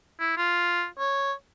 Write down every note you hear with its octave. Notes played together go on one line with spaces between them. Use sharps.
E4
F4
C#5